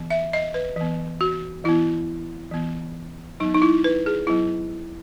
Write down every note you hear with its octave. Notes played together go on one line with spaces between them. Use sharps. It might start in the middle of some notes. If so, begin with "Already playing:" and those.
Already playing: E3 B3
E5
D#5
B4
E3 B3
F#4
E3 B3 E4
E3 B3
F#3 B3 D#4
D#4
E4
B4
G#4
F#3 B3 E4